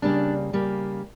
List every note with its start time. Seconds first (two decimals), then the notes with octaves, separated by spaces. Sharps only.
0.02 C#3 G3 A#3 D4
0.53 C#3 G3 A#3